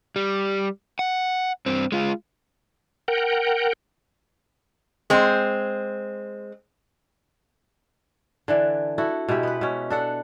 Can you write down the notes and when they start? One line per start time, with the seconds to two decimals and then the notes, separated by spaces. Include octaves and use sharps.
0.16 G3
0.99 F#5
1.66 G2 C4
1.92 G#3 F4
3.08 A#4 F#5 G5
5.10 G#3 C4
8.48 D3 E3 D4
8.98 E4 F#4 A4
9.28 B2 G#3 E4 G4
9.43 B3 B4
9.61 B2 C#4
9.90 D4 A4 F#5